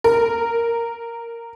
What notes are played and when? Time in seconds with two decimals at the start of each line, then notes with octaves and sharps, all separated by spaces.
0.04 A#4